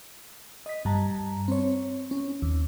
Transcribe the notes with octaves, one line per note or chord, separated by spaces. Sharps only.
D#5 B6
G2 G3 A5 A#5
C4 C#5
C#4
D#2